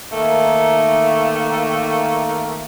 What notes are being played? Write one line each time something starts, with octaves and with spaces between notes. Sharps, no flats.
D#3 A3 A#3